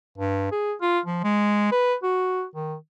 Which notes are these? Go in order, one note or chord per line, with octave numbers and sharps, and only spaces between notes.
G2
G#4
F4
F3
G#3
B4
F#4
D#3